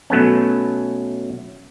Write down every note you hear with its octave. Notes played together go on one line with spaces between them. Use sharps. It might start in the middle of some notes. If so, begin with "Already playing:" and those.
B2 F#3 A3 B3 C#4